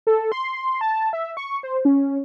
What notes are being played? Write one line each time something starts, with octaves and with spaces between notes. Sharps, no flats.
A4
C6
A5
E5
C#6
C5
C#4